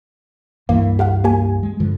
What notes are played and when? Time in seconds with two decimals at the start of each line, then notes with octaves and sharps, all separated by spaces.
0.69 C#2 G2 E3 A#3
0.99 G4 F5 F#5
1.24 A#3 G4 G#5
1.63 G#3
1.80 G2 D3 F3